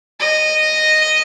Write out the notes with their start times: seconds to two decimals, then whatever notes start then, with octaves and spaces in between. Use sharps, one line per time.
0.20 D#5